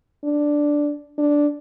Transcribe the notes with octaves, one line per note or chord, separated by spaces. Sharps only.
D4
D4